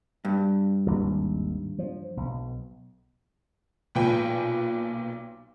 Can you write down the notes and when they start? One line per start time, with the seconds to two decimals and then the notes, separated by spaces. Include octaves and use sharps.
0.25 G2
0.86 G#1 D#2
1.78 F3
2.17 B1
3.95 B1 A#2 B4 G5 G#5